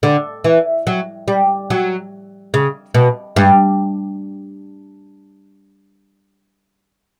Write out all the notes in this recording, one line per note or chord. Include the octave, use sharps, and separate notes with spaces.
D3
E3
F#3
G3
F#3
C#3
B2
G2